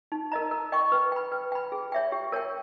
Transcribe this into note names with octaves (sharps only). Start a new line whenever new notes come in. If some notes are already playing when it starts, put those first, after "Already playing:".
D#4
A#4 D#5 A#5
A#4
D#5 G5 C#6
B4
G5 B5
B4
G5 B5
G#4
C#5 E5 G5
G4
A#4 C#5 G5